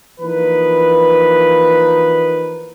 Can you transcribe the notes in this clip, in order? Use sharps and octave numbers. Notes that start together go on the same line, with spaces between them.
E3 F3 A#3 D#4 B4